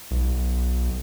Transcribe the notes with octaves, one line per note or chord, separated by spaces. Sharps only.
B1